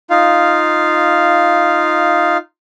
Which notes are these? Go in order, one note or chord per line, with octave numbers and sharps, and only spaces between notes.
D#4 F4 F5